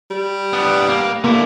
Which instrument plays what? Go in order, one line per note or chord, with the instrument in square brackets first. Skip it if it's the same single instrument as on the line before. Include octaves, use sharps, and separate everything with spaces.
[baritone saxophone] G3
[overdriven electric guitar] B3 D4
A#3
[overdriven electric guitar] D3 E4 [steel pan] A#3